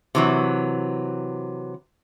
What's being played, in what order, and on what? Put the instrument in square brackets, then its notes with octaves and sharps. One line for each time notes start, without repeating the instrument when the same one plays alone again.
[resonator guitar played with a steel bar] C3 E3 F#3